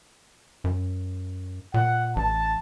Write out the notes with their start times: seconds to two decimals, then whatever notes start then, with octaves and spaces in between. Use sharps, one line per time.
0.64 F#2
1.74 A#2 F#5
2.16 A1 A5